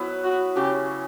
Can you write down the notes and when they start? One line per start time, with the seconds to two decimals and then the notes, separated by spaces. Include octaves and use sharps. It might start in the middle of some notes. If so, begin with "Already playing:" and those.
Already playing: F#3 B3 E4 B4
0.24 F#4
0.56 C#3 F#3 C#4 G4